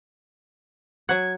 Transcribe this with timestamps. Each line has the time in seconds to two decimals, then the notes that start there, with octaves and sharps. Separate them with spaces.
1.09 F#3 F#5 G#6